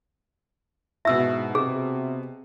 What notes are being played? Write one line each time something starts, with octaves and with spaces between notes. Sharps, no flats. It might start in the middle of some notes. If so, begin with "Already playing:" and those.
G#2 B2 E4 E5 E6
C3 G#4